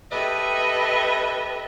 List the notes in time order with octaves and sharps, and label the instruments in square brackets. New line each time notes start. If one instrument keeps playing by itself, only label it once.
[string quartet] G4 A4 B4 D#5 E5